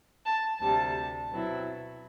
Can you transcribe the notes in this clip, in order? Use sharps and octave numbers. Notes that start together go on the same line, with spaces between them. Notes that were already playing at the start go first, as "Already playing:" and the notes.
A5
D2 C3 G3 A5
B2 F#3 C4 E4